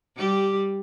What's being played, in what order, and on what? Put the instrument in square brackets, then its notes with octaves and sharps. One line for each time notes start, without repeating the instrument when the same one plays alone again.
[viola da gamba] G3 G4